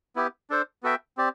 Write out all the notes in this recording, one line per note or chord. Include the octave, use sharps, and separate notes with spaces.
B3 E4 G4
D4 A4 C5
B3 F#4 A4 E5 G5
C4 G4 D5